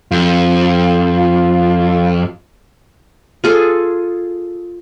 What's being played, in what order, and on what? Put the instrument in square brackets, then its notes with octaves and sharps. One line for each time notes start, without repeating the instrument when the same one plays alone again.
[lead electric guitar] F2 [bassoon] F4
[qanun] F4 G#4 A4